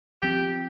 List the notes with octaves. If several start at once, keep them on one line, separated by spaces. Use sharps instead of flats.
F3 C4 G4